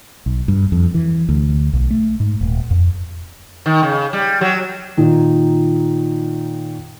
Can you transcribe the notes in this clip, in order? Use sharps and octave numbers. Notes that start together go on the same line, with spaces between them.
B1
G2
F2
E3
D2
B1
A3
G#2
D#1
F2
D#3
C#3
G3
F#3
A#2 D#3 D#4